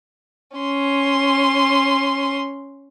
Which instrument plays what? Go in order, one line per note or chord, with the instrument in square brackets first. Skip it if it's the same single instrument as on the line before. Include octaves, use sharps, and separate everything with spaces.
[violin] C#4 C6